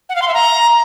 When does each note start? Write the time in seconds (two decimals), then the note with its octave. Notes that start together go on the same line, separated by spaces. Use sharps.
0.09 F#5
0.16 F5
0.22 C6
0.28 E5
0.34 A#5